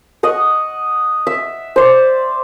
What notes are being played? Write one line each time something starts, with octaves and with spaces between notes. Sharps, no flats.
D#5 F#5 C#6
E5
C5 D5